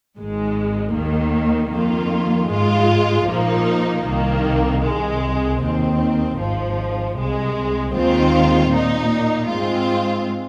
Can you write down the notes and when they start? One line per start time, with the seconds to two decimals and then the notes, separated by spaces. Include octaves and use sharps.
0.16 G#1 G#2 G#3
0.94 D#2 D#3 A#3
1.71 F2 D#3 A#3 F4
2.49 G#2 G#3 F4
3.27 A#1 A#2 F3 A#3 D#4
4.04 C2 C3 D#3 A#3
4.82 C2 C3 G#3
5.60 D#2 D#3 C4
6.37 G#1 G#2 F3
7.16 C2 C3 G#3
7.94 D#2 D#3 G#3 C4 F4
8.71 A#2 A#3 D#4
9.48 G#2 G#3 C4 F4